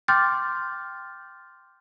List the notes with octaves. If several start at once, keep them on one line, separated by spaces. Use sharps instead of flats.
G5 C6 D6 F6 G6 A6